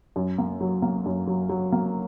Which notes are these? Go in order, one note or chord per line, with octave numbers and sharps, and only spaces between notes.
F#2
A#3
F#3
A#3
F#2
F#3
F#3
A#3